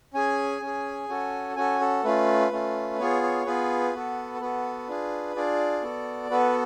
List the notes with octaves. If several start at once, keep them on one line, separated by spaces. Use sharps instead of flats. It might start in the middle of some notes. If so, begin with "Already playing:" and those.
C#4 G#4 G#5
C#4
G#4
C#4 F#4 A4
C#4 F#4 A4 G#5
A4
A3 C#4 F4 B4
A3 C#4 F4
B3 F4 G#4 C#5
C#5
B3 F4 G#4 B4
B3 F#4 A4
B3 F#4 A4 B4
D4 F4 G#4
D4 F4 G#4 D5
B3 F#4 A4
B3 F#4 A4 B4